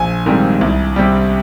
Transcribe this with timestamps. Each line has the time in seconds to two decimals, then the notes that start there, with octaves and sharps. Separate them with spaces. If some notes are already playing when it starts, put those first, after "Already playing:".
Already playing: A#1 G#5
0.26 G#2 D#3 G3 C4
0.61 C2
0.96 C3 G3